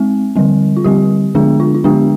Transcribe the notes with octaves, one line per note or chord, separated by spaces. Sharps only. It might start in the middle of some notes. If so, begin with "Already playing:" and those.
Already playing: G#3 C4
D3 G3 C4
F4
D3 G3 C4 G4
D3 G#3 B3 D4 G#4
F4
F4
D3 G#3 B3 D4 G4